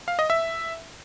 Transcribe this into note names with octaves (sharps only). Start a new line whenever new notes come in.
F5
D#5
E5